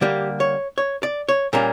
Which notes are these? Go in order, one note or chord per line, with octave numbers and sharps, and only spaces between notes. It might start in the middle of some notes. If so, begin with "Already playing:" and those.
D3 G3 A#3 G4
C#5
C#5
D5
C#5
A#2 G3 A#3 C#4 A#4